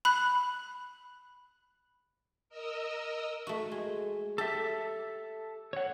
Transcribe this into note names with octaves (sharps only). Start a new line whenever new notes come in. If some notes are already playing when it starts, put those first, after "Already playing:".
B5 F#6
A#4 D#5 E6
A3 F#4
G#3
G4 A4 E5
C#5 F#5